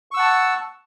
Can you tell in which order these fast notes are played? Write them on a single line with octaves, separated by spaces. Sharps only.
C#6 E6 F#5 A5